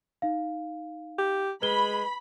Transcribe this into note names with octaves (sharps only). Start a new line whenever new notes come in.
D#4 F5
G4
G#3 B4 B5 G7